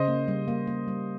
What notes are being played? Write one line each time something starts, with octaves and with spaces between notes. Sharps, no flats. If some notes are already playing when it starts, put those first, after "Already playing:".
Already playing: C#3 C5 D#5
A#3
G3
A#3
A#3
G3